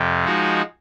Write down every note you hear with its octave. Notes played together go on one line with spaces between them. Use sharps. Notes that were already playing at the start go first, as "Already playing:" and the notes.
Already playing: F2 C3
F3 G#3 D#4 F#4